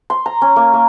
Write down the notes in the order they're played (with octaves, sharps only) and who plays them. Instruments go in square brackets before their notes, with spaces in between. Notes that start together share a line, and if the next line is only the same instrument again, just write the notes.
[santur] C6
A#5
C#4
A#3
A#3